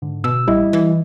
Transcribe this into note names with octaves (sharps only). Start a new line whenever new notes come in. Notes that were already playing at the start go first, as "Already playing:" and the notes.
G#2 D3
B2 E6
A1 G3 E4 D#5
E3